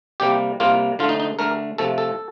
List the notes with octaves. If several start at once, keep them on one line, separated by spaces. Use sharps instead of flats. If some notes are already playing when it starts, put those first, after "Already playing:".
C3 G3 A#3 G4
C3 G3 A#3 F4
D3 A3 F4
D#4
D#4
D3 A3 A#4
C3 F3 A3 A4
A4